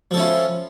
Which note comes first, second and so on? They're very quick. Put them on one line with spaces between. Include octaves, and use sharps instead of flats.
F3 A4 C#4 E4 F4